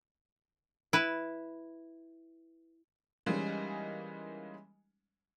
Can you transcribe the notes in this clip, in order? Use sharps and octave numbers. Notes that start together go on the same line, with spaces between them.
E4 B4
E3 G3 G#3 A#3 C#4 D#4